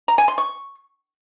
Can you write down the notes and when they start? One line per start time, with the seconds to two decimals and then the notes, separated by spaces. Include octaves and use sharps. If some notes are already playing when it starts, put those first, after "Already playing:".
0.08 A#5
0.18 G#5
0.28 C6
0.38 C#6